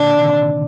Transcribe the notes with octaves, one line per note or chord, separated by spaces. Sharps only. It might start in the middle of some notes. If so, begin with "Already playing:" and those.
Already playing: A#2 D3 D4
C3 D#3